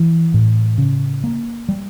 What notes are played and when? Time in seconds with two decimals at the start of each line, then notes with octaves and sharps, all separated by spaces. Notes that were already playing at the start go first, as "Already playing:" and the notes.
Already playing: E3
0.34 A2
0.78 C#3
1.24 A#3
1.69 G3